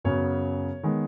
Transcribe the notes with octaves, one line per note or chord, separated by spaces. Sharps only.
F#2 C#3 F#3 B3 C#5
D#3 G#3 B3